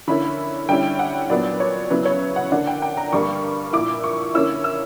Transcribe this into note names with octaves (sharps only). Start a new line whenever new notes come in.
D3 A#3 C#4 E4 B5
D3 G3 C#4 E4 G5
F#5
A#2 F#3 B3 D4 D5
C#5
C#3 F#3 B3 E4 B4
C#5
F#5
D3 A#3 D4 F#5
G5
G5
A#5
G2 D3 G3 A#3 C#6
A#2 A#3 E4 D6
C#6
D3 A#3 C#4 E4 E6
E6